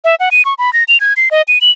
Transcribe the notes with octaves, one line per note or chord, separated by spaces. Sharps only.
E5
F#5
D#7
C#6
B5
A#6
F7
G#6
C7
D#5
D#7
F#7